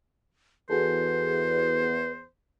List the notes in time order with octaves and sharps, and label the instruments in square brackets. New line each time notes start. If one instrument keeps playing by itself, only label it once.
[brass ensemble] E2 [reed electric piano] F#4 G#4 A4 [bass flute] B4 [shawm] C5